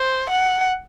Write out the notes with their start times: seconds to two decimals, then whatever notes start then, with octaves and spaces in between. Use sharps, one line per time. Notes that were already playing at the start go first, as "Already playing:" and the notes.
Already playing: C5
0.30 F#5